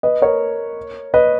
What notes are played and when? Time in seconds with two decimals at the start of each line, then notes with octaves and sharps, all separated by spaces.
0.03 B4 D#5
0.22 A#4 C#5
1.14 B4 D#5